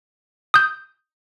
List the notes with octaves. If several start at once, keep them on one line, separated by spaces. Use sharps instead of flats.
D#6 G6